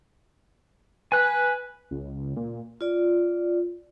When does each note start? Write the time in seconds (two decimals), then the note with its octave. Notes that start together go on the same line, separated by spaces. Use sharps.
1.12 B4 G#5 F#6
1.91 C#2
2.02 C#2
2.37 A#2
2.81 F4 D5